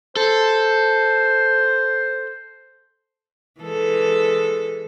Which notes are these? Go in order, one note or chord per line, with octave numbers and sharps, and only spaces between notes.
A4 C5
E3 G#3 A4